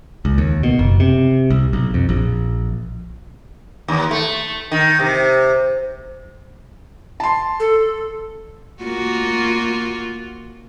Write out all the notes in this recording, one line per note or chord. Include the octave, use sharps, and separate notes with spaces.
C#2
D#2
B2
F#1
C3
C2
B1
F2
A#1
D#2
A3
D#3
C3
A5 C6
A4
A#3 F4 F#4